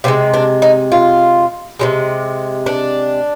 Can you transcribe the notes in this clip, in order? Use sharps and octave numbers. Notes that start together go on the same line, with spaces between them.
C3 F3 G#3 C4
D4
D#4
F4
C3 F3 G#3
D4